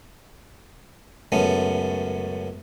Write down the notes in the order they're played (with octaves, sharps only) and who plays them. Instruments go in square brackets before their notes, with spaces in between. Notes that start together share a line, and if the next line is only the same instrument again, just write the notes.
[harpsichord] C#2 F#2 A3 B3 C#4